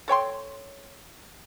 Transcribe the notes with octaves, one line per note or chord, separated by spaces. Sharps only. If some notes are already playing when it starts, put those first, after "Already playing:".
A4 C#5 G5 C6